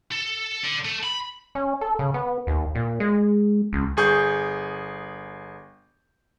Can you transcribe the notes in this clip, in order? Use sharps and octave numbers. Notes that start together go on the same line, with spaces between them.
A4
D3
A3
B5
C#4
A4
C#3
B3
D#2
A#2
G#3
C#2
G1 G#4 C#6 G6